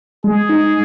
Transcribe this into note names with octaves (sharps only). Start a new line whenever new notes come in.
G#3 G#4
D#4